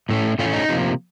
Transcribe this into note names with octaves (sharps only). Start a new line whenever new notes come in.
A2 A3 C#4
A2 A3 C#4 F4
D#4
C3 F3 A#3